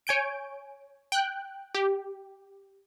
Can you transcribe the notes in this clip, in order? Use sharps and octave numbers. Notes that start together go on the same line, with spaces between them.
C#5 G#5 G6 D7
G5 F#6
G4